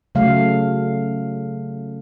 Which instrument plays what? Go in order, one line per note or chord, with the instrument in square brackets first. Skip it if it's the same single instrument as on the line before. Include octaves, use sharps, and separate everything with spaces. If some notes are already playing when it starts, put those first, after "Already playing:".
[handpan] C#3 F#3 A3 F5